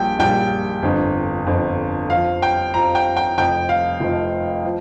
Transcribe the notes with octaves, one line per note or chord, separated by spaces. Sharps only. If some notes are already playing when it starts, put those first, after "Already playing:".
Already playing: A#1 A#2 G3 G5
A#1 A#2 G3 G5
G1 F2 D3
G1 F2 D3
F2 F5
F3
G5
F2 F3 A#5
G5
G5
F1 F2 F3 G5
F5
F1 F2 F3
F3